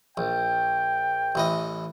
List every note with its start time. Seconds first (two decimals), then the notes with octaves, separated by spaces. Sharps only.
0.17 A#1 G5
1.35 A1 E3 D#5